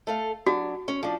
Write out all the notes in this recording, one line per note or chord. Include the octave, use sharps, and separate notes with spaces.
A3 A4 F5
F#3 D4 F#4
C#4
F3 D4